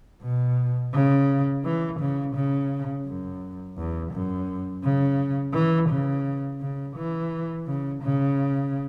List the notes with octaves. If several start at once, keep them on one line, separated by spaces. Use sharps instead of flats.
B2
C#3
E3
C#3
C#3
F#2
E2
F#2
C#3
E3
C#3
C#3
E3
C#3
C#3